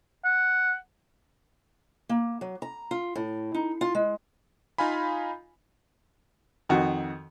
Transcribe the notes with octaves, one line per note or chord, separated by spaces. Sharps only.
F#5
A#3
F#3
A#5
F4
A2
D#4
F4
G#3
D#4 F4 F5 G#5 B5
F2 D#3 F#4